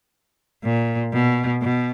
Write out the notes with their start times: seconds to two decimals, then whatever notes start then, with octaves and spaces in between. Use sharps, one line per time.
0.64 A#2
1.13 B2
1.62 B2